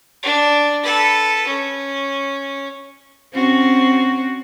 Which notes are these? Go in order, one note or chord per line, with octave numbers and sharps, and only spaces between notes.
D4
A4 B4
C#4
C4 C#4 F#4